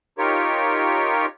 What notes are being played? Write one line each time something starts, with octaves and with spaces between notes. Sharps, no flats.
D#4 F4 G4 A#4 C#5